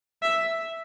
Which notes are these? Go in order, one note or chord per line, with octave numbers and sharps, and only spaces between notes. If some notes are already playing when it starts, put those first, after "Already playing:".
E5